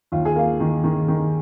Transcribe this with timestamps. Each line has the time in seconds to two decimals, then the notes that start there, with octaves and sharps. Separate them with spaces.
0.12 D#2 F4
0.25 G#4
0.36 A#3 F4
0.60 D#3
0.84 D#3
1.08 D#3